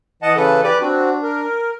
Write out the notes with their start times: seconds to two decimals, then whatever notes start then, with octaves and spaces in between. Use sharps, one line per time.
0.22 E3 D#5 F#5 A5
0.36 C#3 A4 B4
0.63 G4 B4 D5
0.80 C4 D4 F#4
1.23 A#4